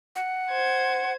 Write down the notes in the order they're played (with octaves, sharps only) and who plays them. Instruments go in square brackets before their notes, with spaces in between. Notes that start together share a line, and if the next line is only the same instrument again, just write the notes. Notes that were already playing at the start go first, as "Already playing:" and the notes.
[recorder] F#5
[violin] C5 G#6